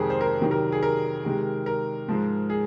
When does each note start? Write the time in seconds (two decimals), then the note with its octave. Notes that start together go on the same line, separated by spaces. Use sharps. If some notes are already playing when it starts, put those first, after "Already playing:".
Already playing: F2 C3 D#3 G#3 G#4 A#4 C5
0.10 C5
0.21 A#4
0.41 C3 D#3 F#3
0.51 A#4
0.72 G#4
0.83 A#4
1.24 C3 D#3 G#3
1.66 A#4
2.08 G#2 F3 G#3
2.50 G#4